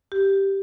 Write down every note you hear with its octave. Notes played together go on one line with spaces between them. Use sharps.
G4